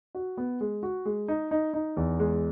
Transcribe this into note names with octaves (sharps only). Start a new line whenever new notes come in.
F#4
B3
G#3
F#4
G#3
D#4
D#4
D#4
E2
G#3